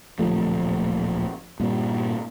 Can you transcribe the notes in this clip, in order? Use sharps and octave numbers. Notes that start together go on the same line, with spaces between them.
D1 A#1 F3 A3
G2 A#2 G3